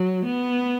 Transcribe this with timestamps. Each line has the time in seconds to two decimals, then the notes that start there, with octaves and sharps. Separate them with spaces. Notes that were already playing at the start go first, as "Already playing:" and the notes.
Already playing: F#3
0.25 B3